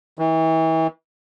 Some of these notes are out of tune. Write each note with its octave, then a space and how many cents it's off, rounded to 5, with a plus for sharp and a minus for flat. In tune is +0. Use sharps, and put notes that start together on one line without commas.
E3 -35